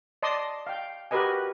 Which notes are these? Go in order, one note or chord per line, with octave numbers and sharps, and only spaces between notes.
D5 D#5 A5 C6 D#6
F5 G5
F#4 G4 A#4 B4 D#5 G#5